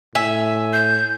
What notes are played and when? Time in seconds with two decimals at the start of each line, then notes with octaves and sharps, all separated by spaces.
0.15 A2 E5 G#5
0.73 G6